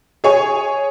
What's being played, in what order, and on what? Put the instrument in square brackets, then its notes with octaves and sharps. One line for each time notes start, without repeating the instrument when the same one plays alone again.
[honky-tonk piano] G#4 C#5 G#5